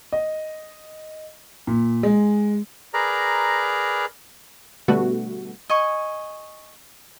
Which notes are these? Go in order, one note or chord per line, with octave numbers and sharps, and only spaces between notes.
D#5
A#2
G#3
G#4 A#4 B4 D5 A#5
B2 D3 G3 A3 B3 F#4
D#5 G#5 C#6